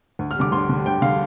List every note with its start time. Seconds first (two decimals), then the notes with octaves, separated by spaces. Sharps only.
0.19 D2
0.31 F6
0.36 D3 G3 D6
0.52 D2 C6
0.69 D3 G3
0.86 D2 G5
1.02 D3 G3 F5